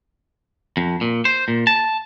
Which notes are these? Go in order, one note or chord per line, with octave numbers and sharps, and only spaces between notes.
F2
A#2
C5
A#2
A5